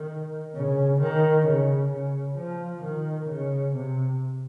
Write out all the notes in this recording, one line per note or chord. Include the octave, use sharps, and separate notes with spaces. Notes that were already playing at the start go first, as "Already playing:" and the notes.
Already playing: D#3
C#3
D#3
C#3
C#3
F3
D#3
C#3
C3